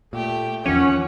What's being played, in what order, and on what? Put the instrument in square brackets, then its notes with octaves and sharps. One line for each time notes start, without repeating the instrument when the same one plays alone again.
[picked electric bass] A#2 [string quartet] A3 G4 G5
[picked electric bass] E2 D#3 F3 [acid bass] C#4 [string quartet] C#5 F#5 D6